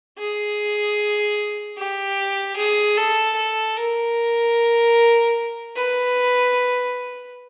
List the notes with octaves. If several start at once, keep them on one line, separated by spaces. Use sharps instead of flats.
G#4
G4
G#4
A4
A4
A#4
B4